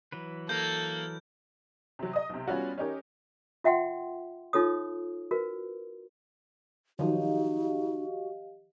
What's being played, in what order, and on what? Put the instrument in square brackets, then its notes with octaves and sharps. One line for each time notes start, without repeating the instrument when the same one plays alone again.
[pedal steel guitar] E3 F#3 B4
[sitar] A#3 [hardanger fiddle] A4 [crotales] G6
[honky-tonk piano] C3 F#3
D#5 D#6
B1 C3
G3 B3 C#4 F4 F#4
C#4 D#4 G4 A#4
[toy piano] F4 E5 F#5 G5 C6
D#4 F4 A4 C#5 D#6
F#4 A#4 B4
[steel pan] D#3 F3 F#3 [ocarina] D#4 [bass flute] F#4 [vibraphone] G4 D#5 F5